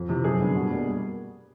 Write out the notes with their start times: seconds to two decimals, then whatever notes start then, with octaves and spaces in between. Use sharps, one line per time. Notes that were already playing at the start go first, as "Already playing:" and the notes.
Already playing: F2
0.09 C3 E3
0.24 F#2 G#4
0.40 D3 G3 B3
0.55 B2
0.71 G3 A#3